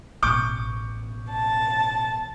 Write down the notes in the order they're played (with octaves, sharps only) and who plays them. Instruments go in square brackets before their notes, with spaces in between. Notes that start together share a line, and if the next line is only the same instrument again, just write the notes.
[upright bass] A1 B2 [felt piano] C#6 D6 G6
[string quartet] A5